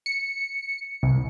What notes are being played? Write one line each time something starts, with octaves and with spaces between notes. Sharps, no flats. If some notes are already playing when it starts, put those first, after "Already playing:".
C#7
C2